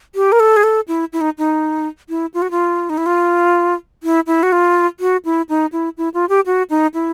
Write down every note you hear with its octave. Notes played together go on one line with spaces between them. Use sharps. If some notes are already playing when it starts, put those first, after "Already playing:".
G4
A#4
A4
G#4
A4
E4
E4
D#4
D#4
E4
F4
F#4
F4
D#4
E4
F4
E4
E4
F#4
F4
F#4
E4
D#4
E4
E4
F4
G4
F#4
D#4
E4